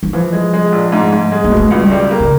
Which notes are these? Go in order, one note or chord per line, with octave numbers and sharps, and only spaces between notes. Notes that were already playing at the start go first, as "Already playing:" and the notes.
E3
E3 F3
G#3
G#3
A#1
G#2
G#2
G#3
A#3
B2 A3
C#2 G#3
G3
F#3 G3
A#3
C#3